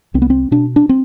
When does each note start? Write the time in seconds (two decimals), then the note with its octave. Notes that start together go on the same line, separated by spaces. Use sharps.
0.14 C2 C4
0.22 B3
0.30 C4
0.51 B2 D4
0.76 D4
0.89 C4